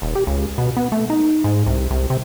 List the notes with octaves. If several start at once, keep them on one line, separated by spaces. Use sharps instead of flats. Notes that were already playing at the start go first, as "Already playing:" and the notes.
D#1
G4
C#2
B2
B3
A3
D#4
G#2
C2
C2
C3